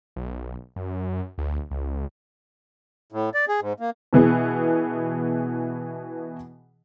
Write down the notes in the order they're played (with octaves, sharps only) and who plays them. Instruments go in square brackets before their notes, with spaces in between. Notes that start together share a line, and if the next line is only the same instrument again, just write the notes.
[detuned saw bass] B1
F#2
D2
C#2
[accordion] A2
D5
G#4
G#2
A#3
[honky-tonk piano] B2 E3 B3 G#4